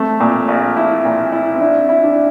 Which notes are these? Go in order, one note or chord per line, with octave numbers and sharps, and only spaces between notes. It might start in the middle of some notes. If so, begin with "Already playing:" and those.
Already playing: A3 C4
A#2
A#1
E4
A#2
E4
C4
D4 E4
E4
D4